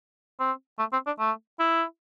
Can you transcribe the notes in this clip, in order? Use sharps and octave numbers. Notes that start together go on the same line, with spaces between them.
C4
A3
C4
D4
A3
E4